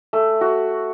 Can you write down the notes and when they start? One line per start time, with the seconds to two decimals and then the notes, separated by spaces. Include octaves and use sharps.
0.13 A3
0.41 F#4